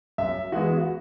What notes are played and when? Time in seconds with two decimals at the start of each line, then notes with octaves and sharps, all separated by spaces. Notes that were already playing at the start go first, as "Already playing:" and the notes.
0.18 F#2 E5
0.52 E3 G#3 B3 F#4
0.78 F#4